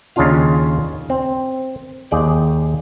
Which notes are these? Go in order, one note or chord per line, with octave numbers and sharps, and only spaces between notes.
D#2 C#3 C#4 D4 F4 F5
C4
D#2 G#4 D5 G5